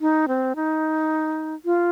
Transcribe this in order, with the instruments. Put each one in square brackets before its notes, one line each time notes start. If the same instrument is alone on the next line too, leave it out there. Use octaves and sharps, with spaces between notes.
[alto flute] D#4
C4
D#4
F4